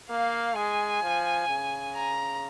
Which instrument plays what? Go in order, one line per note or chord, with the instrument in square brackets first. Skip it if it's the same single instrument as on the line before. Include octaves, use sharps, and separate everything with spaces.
[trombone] A#3 [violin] F5
[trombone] G#3 [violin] G#5
[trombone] F3
C#3
[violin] A#5